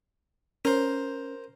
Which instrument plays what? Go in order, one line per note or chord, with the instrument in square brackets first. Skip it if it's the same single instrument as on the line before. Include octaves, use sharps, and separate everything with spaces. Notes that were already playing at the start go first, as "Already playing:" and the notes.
[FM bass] C#4 [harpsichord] A#4 C5